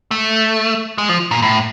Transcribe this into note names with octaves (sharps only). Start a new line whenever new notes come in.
A3
G#3
F3
A#2
A2